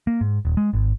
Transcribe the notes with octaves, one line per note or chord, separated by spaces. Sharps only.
A#3
G#2
D#1
G#3
G#1